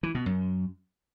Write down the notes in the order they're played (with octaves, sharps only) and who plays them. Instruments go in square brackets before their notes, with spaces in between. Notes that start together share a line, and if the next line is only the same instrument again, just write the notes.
[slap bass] E3
B2
F#2